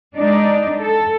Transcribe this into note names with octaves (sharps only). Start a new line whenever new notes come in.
G#3 D4 D#4 D5
A4